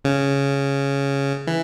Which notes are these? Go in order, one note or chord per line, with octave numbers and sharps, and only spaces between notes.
C#3
E3